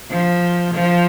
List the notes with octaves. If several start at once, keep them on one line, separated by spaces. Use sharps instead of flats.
F3
F3